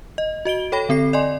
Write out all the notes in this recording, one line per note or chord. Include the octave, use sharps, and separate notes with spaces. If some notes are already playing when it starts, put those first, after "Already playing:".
D#5
F#4 D#5 D7 G7
A4 C#5 G5 B5 A#6
D3 C4 A4 C7
D5 D#5 G#5 C6